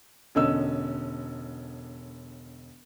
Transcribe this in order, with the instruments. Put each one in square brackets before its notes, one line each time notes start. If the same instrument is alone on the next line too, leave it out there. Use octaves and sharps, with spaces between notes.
[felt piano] E1 D3 C#4 D#5 E6